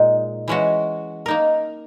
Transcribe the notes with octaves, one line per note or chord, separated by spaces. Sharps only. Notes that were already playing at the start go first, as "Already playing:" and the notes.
Already playing: A#2 G#3 D#4
E3 G#3 C#4 F#4
A#3 D#4 A#4